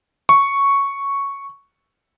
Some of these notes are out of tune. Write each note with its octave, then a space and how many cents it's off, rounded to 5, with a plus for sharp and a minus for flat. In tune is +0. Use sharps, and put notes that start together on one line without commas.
C#6 +0